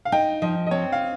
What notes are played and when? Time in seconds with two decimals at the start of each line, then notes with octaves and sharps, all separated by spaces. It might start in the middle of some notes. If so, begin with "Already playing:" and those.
0.05 F5
0.12 D#4 G5
0.42 F3 D#5
0.67 D#5
0.71 C4 C#5
0.92 F5